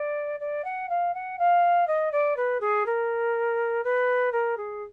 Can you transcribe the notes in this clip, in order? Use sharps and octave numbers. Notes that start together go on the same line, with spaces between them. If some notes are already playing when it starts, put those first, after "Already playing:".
Already playing: D5
D5
F#5
F5
F#5
F5
D#5
D5
B4
G#4
A#4
B4
A#4
G#4